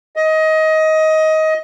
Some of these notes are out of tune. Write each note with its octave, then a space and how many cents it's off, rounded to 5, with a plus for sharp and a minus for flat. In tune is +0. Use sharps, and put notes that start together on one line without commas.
D#5 +20